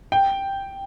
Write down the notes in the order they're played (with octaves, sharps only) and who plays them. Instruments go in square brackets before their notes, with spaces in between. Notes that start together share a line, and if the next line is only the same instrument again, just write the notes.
[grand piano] G5